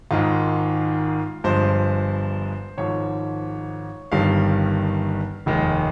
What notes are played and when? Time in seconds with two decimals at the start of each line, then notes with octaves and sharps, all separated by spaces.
0.11 G#1 G#2 D#3 G#3 F4
1.44 G1 G2 F3 G#3 C5
2.78 G#1 G#2 F3 C#5
4.12 G1 G2 D#3 G3 F5
5.46 F1 D#2 D#3 G#3